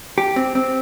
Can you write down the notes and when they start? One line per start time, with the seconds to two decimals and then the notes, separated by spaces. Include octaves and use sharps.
0.18 G4
0.36 C4
0.55 C4